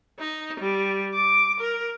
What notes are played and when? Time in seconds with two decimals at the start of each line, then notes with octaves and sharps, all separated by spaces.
0.19 D#4
0.60 G3
1.14 D6
1.60 A#4